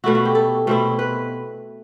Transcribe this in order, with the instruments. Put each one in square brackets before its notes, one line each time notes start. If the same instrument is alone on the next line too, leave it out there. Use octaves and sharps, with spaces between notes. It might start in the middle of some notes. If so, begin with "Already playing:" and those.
[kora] B2 A3 E4 F#4
F#4
G4
A4
B2 A3 C4 E4
B4